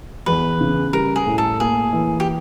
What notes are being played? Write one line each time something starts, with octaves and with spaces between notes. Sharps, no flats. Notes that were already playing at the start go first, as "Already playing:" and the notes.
E2 B4
C#3
G3 A#4
G#4
A2
A4
A#3 G#4
E3
G4